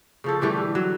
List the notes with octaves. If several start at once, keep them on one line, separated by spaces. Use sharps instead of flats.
C#3 F3 A4
D3 E3 G3 A3
F#3